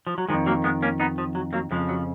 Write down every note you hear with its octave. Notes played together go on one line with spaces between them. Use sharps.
F3
F#3
D#3 F3 G#3
F2
F#3 A#3
G#3 B3
A#3 C#4
B3 D#4
F3
F#3
F#3 A#3
F2 C#3 F3 G#3
F#3